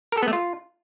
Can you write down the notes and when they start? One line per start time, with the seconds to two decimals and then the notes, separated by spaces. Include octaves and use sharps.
0.12 A#4
0.18 A4
0.23 B3
0.28 A3
0.33 F4